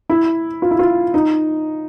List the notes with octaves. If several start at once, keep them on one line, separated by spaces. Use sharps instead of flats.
E4
F4
E4
F4
D#4